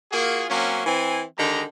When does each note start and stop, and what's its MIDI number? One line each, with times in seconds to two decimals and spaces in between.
0.12 0.45 58
0.12 0.45 65
0.12 0.45 66
0.12 0.45 68
0.49 0.85 54
0.49 0.85 58
0.49 0.85 60
0.49 0.85 61
0.86 1.21 52
0.86 1.21 60
0.86 1.21 80
1.37 1.63 50
1.37 1.63 51
1.37 1.63 56
1.37 1.63 67
1.37 1.63 82